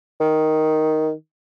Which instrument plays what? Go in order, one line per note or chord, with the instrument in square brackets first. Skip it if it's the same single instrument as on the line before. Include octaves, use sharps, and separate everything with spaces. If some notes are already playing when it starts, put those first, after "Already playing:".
[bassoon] D#3